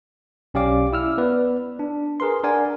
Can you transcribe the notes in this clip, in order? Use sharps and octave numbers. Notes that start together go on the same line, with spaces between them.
B1 C#4 G4 D5 F5 D6
E4 E6 F6
B3 B4 D5
D4
G#4 A#4 B4 C6
D4 A#4 D5 F#5 G#5